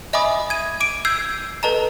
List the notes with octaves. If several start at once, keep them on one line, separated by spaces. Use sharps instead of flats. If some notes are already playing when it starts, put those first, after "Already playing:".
D#5 E5 G#5 B5 D6 D#6
G#6 D#7
D6 D7 D#7
E6 G6 G#6 C7
A4 B4 D#5 A5 A#5